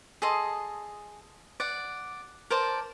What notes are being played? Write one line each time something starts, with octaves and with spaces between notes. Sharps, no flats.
G#4 A4 D#5 C6
D5 F#5
A#4 C5 D5 A5